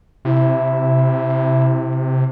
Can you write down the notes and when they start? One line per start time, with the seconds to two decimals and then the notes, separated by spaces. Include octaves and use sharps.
0.25 C3 E4